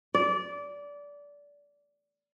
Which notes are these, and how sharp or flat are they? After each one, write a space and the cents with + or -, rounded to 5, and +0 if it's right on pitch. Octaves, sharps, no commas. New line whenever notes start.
D5 -20